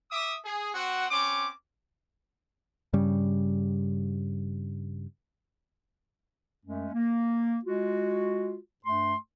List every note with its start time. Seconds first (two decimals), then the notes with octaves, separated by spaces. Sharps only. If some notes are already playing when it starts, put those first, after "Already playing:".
0.10 E5 D6 D#6
0.44 G#4
0.74 C4 F#4 F#5
1.11 C4 C#4 D6
2.93 G2 C#3 G3
6.65 F#2 G#3 A3 C#4
6.93 A#3
7.64 G#3 F4 F#4
8.85 G2 A3 C6